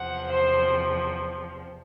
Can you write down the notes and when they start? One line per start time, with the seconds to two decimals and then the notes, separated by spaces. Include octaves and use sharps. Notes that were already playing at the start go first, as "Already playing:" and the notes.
Already playing: E2 C3 F3 F#5
0.31 C5